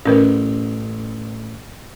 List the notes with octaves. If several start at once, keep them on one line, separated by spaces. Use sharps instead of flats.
A1 C#4 A#4 B4